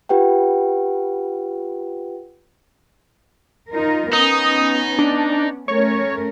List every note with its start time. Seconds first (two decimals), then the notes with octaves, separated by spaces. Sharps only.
0.09 F4 G4 B4 F#5 G5
3.71 D#4 F4 A#4
4.13 B3 C#4 D#4 D#6
4.99 D4
5.68 A3 C#4 A#4 C#5